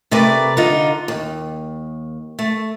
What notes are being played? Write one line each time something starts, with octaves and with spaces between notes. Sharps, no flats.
C3 A3 A#4 B4 D5
D3 D#4 F4
D#2
A3